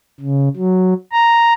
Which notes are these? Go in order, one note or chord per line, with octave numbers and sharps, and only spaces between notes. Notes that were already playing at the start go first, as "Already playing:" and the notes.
C#3
F#3
A#5